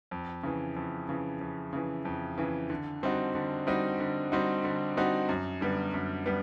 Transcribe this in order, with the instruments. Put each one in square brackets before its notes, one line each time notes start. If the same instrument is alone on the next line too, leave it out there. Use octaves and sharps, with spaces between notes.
[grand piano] F2
C#3 E3
F2
C#3 E3
F2
C#3 E3
F2
C#3 E3
D3
G3 C4 D#4 F#4
D3
G3 C4 D#4 F#4
D3
G3 C4 D#4 F#4
D3
G3 C4 D#4 F#4
F#2
D3 G3 B3
F#2
G3 B3